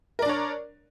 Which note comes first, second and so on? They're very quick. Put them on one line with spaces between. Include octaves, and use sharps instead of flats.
A#4 D5 D4 C#5